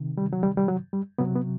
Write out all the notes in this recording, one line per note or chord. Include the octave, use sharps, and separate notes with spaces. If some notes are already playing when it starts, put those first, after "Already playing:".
Already playing: C3 D#3
G3
F#3
G3
G3
F#3
G3
C3 F#3 B3
B3